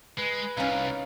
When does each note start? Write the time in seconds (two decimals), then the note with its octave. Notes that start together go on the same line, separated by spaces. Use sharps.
0.18 G#3 B4
0.57 C2 C#4 D#4 F5